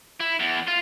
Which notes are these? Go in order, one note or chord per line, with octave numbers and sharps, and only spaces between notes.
E4
E2
F4